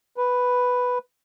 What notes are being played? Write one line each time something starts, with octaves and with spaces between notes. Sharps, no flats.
B4